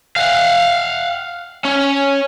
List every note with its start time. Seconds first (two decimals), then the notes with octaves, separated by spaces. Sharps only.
0.16 F5 F#5
1.65 C#4